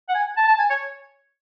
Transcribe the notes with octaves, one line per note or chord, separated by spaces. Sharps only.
F#5
G#5
A5
A5
G#5
C#5